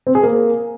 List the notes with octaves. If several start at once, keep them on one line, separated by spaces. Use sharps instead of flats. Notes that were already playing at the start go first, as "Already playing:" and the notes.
C4
G#4
A#3